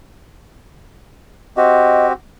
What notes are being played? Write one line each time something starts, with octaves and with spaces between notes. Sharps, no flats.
C4 F#4 G4 D#5